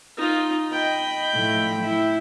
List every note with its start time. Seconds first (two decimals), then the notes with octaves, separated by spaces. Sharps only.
0.17 D#4 F4
0.72 D#5 G5 B5
1.34 A2 F3
1.79 E4